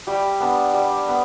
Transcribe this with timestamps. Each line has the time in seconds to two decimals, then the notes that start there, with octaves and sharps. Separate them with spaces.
0.07 G3 G4
0.40 B3 D4
0.74 G3
1.08 B3